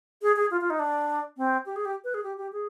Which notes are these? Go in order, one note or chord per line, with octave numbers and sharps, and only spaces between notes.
G#4
G#4
F4
F4
D#4
D4
C4
G4
G#4
G4
B4
G#4
G4
G4
G#4